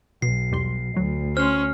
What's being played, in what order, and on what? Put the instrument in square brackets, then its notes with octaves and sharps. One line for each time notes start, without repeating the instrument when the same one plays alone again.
[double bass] B1 [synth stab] B2 [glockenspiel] C7
[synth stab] E2 G3 C6
[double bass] D2 [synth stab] F#3
[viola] C#4 [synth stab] C5 C6 [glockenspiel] F6